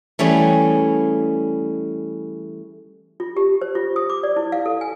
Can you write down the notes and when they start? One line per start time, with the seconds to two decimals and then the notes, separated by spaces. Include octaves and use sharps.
0.19 E3 G3 A3 C#4 G#4
3.20 F4
3.37 G4
3.61 C5
3.75 F4
3.96 D#6
4.10 D6
4.23 D5
4.36 E4
4.52 F5
4.66 A4
4.81 G#5